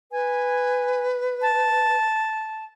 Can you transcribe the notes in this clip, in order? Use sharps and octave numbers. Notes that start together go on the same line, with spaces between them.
B4 G#5
A5